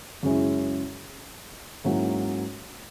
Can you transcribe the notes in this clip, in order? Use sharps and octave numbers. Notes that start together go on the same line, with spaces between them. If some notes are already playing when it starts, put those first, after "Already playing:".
F#2 C#3 G#3 C#4 E4
G#2 F#3 A#3 C#4 E4